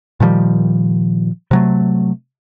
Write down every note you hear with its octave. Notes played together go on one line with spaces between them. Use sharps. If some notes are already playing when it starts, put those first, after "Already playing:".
A#2 D#3 F3 G3
C3 F#3 A3